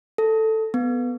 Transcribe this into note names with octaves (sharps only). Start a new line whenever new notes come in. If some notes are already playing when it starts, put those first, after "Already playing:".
A4
B3